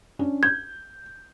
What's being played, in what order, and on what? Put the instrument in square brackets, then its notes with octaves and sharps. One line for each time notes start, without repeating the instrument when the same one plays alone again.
[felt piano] C#4 D4
[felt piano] G6 [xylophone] G#6